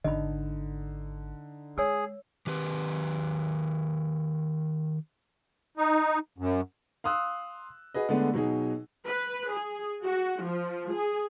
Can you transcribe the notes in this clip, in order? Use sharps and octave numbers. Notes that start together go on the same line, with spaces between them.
G#1 D3 D#4 D#5 B5
G#3 G#4 C#5 E6
D#3 G4 B4
D#4
F#2
F5 C6 D#6 E6 F#6
F#4 G#4 B4 D#5
D3 G#3 A3 B3 D4
B2 F#3 D#4 G#4
B4
G#4
F#4
F3
G#4